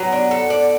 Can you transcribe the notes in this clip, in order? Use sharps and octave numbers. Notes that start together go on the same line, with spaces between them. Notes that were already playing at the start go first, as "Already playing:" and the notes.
Already playing: F#3 B3 F#4
D4
A4
D5